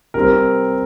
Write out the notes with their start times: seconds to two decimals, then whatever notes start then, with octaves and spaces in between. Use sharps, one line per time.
0.14 C3 G3 C4 A#4